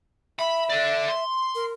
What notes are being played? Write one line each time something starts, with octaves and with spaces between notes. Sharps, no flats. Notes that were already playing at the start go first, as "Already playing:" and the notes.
E5 B5
A4 D5
C6
A#4